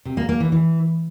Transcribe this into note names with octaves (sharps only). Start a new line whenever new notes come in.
C3
A#3
A#3
E3
E3